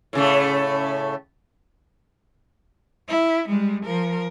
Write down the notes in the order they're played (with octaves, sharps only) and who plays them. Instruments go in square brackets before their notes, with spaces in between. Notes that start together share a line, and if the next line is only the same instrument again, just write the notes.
[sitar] A2 C#3 A3
[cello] E4
G3 G#3
F3 A#4